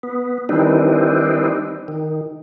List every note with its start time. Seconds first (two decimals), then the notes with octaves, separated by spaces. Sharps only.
0.03 B3
0.49 D#3 E3 G3 C4 D4 D#4
1.88 D#3